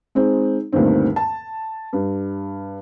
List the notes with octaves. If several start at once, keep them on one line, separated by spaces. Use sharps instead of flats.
G#3 C4 D#4
D2 G2 A#2 D#3 C4
A5
G2